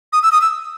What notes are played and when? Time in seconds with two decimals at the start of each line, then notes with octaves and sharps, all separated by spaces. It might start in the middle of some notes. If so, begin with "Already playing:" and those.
0.13 D#6
0.23 E6
0.32 D#6
0.42 E6